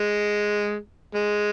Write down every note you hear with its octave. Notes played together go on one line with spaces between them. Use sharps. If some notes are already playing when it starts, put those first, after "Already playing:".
Already playing: G#3
G#3